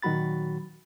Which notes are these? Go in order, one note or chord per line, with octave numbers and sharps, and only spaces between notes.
A#2 D#3 F#3 F#4 B5 A6